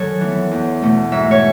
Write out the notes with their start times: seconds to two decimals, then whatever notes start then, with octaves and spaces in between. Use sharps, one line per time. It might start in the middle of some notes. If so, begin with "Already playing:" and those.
Already playing: F#2 D#3 F#3 A4 C#5
0.21 E3 B3
0.51 E2
0.82 B2 A3
1.12 G#2 E5
1.31 C#5